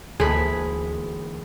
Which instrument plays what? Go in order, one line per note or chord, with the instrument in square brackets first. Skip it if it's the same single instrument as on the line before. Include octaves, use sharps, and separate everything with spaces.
[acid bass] D2 [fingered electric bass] D3 E3 A#3 [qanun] G#3 B5 [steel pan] G#4 A4